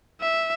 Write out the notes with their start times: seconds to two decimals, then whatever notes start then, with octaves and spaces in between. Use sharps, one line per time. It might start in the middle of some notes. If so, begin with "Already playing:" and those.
0.21 E5